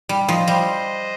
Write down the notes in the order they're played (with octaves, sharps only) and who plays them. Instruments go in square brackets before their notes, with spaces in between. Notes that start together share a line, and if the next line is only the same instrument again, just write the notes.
[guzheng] G3
[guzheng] F3 [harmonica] C5 D#5
[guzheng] G3